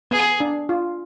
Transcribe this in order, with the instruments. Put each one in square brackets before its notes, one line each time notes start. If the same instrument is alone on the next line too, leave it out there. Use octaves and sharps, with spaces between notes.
[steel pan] B3 [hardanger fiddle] G#4
[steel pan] D4
F4